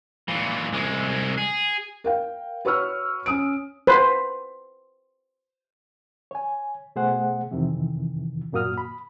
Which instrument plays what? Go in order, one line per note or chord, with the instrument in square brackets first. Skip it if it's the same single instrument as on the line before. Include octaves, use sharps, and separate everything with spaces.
[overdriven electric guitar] A#2 E3
C2 G#3
G#4
[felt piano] A#4 F5 G5
F#4 B4 C#5 C#6 E6 F6
C#4 D#6 D7
[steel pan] B4 C5
[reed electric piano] C#5 G#5
B2 A3 G#4 C5 F#5
F2 C3 D#3 E3
F#2 A#2 A#3 F#4 D#6 F6
B5